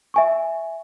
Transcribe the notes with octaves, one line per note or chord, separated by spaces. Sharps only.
E5 G#5 C#6